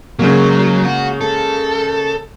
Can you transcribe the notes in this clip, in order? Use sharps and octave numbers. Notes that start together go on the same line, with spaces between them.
C#3 F#3 G#3 A#3
F#4
A4